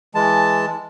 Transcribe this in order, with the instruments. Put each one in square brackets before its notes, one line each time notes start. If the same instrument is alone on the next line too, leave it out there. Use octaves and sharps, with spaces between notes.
[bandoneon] E3 G#3 A5